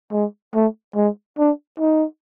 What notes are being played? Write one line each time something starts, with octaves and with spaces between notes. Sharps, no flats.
G#3
A3
G#3
D4
D#4